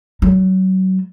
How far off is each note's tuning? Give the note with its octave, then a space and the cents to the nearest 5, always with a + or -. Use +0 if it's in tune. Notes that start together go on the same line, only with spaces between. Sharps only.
F#3 +25